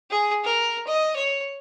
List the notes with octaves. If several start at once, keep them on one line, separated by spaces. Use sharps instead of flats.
G#4
A#4
D#5
C#5